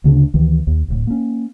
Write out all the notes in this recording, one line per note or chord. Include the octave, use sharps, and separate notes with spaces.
D2 C#3 C#4 D4
D2 D#3 E3
D#2
D1 A1 A2
A#3 C#4